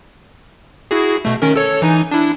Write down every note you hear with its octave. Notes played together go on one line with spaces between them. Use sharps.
E4 F#4 G#4
B2 A3
D#3 C#4 A#4
A4 C#5
E3 D#4 G#5
D4 E4